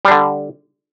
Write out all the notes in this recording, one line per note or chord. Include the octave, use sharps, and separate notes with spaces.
D3 G3 D4